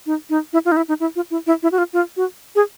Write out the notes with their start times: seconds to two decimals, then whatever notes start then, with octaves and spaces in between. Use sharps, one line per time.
0.06 D#4
0.30 D#4
0.53 E4
0.65 F4
0.72 D#4
0.77 E4
0.89 D#4
1.00 E4
1.16 F4
1.31 E4
1.47 E4
1.63 E4
1.72 F#4
1.78 F4
1.93 F4
2.17 F#4
2.56 G#4